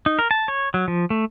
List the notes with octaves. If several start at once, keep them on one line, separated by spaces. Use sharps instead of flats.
D#4
A#4
A5
C#5
F#3
F3
A3